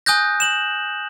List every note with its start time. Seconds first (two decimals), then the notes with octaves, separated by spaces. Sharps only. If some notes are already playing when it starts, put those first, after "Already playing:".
0.06 G#5 D#6 F#6 G6 A#6
0.40 E7 F#7